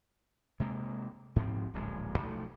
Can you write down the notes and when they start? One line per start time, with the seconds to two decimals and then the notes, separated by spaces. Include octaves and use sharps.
0.60 C3 G#3 A#3
1.36 G#2 F3 C4
1.74 D1 A#1 G#3
2.18 B1 F3 A3